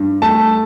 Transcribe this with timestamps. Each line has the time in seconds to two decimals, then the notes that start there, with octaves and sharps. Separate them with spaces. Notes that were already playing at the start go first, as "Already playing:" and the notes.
Already playing: G2
0.22 A3 A5